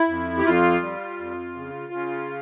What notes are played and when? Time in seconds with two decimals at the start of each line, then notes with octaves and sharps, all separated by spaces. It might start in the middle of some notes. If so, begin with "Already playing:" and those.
Already playing: E4
0.08 F2
0.38 G4
0.45 F2 F4
0.82 G3
1.19 F2
1.56 C#3
1.93 C#3